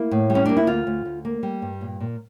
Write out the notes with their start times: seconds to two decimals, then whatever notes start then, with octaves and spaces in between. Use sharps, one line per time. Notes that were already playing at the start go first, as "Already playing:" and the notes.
Already playing: A#3 E4
0.11 A2
0.30 G3
0.35 C#4
0.46 A#3 D4
0.57 E4
0.67 D2 F4
0.87 D2
1.05 D2
1.25 A#3
1.43 G3
1.62 G2
1.81 A#2
2.00 A#2